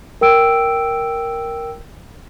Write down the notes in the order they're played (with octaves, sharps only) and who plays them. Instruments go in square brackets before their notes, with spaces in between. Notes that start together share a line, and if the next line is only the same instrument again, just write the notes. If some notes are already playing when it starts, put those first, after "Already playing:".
[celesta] A#4 G5 E6 D7